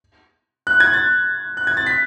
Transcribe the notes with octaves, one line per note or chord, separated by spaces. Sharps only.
F#6
G#6
A6
F#6
G#6
A6
B6